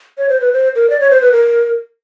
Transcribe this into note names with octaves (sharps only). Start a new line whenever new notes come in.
C#5
C5
B4
C5
A#4
D5
C#5
C5
B4
A#4